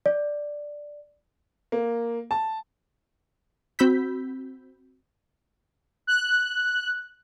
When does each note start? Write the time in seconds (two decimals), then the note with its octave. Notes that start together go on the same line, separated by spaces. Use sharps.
0.06 D5
1.72 A#3
2.31 A5
3.79 C4 F#4 B5 E6 G6 B6
6.07 F#6